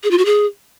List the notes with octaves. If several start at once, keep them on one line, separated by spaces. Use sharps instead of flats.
G#4
F4
F#4
G#4